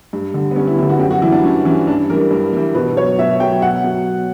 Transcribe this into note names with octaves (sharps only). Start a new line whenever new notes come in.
G2
D3 G3
B3
G2 C#4
E4
D3 G3 E4
F#4
F#2 G4
F#4
E3 G3 E4
D4
F#2 C#4
E3 G3 C#4
G2 D4
E3 G3 A#4
G2
E3 G3
B2 B4
F#3 C#5
B2 E5
F#3 G5
B2 F#5
F#3